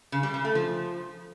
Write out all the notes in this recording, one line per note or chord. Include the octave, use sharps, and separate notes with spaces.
C#3
G3
C#3
A3
F3